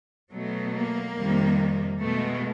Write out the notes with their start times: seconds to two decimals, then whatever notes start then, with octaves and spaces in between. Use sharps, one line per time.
0.32 B2 F#3 A3
0.74 A#3
1.16 F2 C3 D#3 G3
2.00 B2 G#3 A3